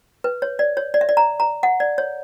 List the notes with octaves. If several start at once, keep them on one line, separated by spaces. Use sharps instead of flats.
B4
C#5
D5
C#5
D5
E5
D5
A#5
A#5
F#5
D5
C#5